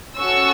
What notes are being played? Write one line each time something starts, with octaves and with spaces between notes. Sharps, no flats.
C#4 F#4 A4 C#6 E6